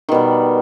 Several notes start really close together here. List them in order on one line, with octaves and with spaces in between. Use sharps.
D#3 B2 G3